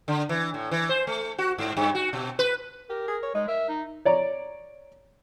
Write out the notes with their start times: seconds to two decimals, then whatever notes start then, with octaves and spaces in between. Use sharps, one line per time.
0.08 D3
0.29 E3
0.54 A2
0.71 E3
0.89 C5
1.07 A3
1.38 F#4
1.58 G#2
1.77 G2
1.95 F#4
2.13 B2
2.39 B4
2.90 G4 A#4
3.08 G#4
3.23 C#5
3.35 G#3 D#4
3.48 A#4 E5
3.69 D#4
4.05 C#5 D5 A#5